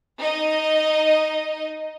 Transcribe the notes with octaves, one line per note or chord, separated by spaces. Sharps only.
D#4 D#5